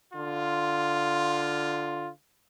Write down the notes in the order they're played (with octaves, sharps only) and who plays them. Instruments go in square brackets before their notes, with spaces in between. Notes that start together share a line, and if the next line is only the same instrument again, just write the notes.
[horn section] D3 F4